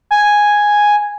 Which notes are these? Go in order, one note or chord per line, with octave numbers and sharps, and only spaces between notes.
G#5